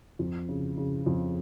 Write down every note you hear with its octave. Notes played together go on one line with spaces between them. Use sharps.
F2
C#3
C#3
F2